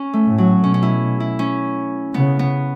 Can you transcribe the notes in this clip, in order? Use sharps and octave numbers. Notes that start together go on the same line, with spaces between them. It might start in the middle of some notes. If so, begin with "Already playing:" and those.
Already playing: C#4
A3
A2
F#3
B2 C#4
C#4
E4
E4
C#4
C#3 B3
B3